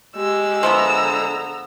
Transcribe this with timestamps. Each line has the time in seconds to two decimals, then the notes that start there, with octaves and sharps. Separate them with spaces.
0.17 G#3 G4 E6
0.63 D3 F3 A3 B3 A#5